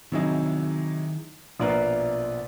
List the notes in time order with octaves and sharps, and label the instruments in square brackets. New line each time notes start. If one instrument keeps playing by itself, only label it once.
[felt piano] C3 F#3 D#4 [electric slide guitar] D#3 E4 G#4
[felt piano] A#1 F4 B4 [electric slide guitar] B2 D5 A#5